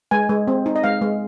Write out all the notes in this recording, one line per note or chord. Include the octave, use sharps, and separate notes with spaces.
G#3 G#5
G#3
C4
D#4
D#5
G#3 F5
G#3